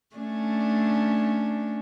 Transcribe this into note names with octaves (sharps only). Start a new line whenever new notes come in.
A3 C#4 D4